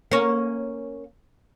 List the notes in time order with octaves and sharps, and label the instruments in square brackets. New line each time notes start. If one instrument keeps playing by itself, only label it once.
[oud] A#3 C#4